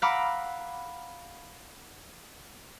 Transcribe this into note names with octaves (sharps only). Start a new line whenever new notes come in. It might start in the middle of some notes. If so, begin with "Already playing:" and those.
F5 F#5 A#5 B5 D6 E6